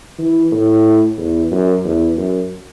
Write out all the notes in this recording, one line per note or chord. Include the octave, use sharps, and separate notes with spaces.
E3
A2
E2
F#2
E2
F#2